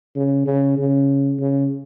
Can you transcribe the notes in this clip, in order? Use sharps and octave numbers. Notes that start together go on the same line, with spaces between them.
C#3
C#3
C#3
C#3